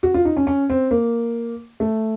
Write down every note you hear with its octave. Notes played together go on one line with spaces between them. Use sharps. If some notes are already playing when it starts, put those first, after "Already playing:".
F#4
F4
D#4
C#4
C#4
C4
A#3
A3